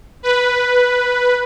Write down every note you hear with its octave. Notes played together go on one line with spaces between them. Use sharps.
B4